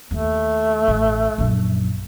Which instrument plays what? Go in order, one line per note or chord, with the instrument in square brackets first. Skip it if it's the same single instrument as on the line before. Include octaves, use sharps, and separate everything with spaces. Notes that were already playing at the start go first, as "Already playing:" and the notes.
[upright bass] D#2 [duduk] A3
[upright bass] A1
A#1 F#2